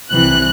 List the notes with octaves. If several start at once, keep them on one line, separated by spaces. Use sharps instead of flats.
C2 C3 E3 F#6